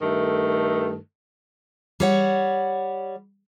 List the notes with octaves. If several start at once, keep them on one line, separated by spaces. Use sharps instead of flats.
G2 D#3 A3 A4
G3 C#5 F#5